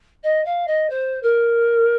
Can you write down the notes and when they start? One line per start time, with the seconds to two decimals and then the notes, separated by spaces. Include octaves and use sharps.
0.23 D#5
0.45 F5
0.67 D#5
0.89 C5
1.22 A#4